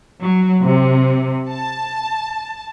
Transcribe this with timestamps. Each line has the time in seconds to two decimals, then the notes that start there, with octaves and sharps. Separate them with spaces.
0.22 F#3
0.64 C3
1.50 A5